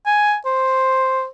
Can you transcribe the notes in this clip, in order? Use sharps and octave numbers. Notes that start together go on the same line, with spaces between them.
G#5
C5